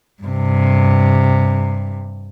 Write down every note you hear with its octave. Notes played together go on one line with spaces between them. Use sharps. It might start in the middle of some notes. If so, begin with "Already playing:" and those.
G2 C3